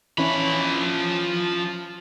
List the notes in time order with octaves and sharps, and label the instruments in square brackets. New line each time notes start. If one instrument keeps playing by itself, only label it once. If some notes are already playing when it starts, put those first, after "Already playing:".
[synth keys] E3 C#4 [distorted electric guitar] F3 B5